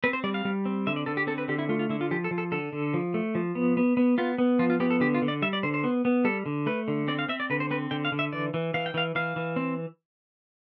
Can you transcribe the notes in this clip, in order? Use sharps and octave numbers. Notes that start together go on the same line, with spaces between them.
C4 B4
C5
G3 D5
F5
G3
C4
D3 E5
D5
D3 A4
G4
C4 A4
B4
D3 G4
E4
A3 F4
F4
D3 E4
F4
F3 G4
A4
F3
A4
D3 A4
D3
F3
A3
F3
B3
B3
B3
B3 F4
B3
F3 F4
F4
B3 G4
A4
D3 G4
F4
D3
D5
G3 E5
D5
D3 C5
C5
B3
B3
G3 A4
D3
A3 B4
D3
C4 D5
F5
C4 E5
D5
D3 B4
C5
C4 B4
D3 G5
F5
D3
E5
E3 D5
E3
E3 F5
G5
E3 F5
E3 F5
E3
C4